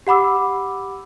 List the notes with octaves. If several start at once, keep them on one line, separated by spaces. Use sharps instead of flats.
G4 F#5 B5 D6 E6